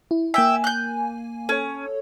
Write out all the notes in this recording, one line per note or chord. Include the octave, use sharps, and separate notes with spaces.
E4
A#3 E5 G5 G#5
F#6 G6
C#4 A4 C#5